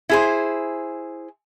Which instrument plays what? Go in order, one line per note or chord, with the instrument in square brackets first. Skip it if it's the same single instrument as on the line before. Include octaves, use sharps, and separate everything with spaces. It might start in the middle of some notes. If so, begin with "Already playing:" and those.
[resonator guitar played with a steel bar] E4 G#4 C5